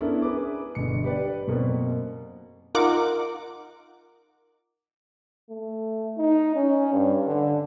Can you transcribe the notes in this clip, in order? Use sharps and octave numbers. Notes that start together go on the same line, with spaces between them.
B3 C#4 D4 E4 A4 A#4
G#4 B4 D6
G1 B2 C#7
G4 B4 D5
F#2 B2 A#3 C4
D#4 F4 A#4 F#5 D6
A3
D#4
C#4
G2
D3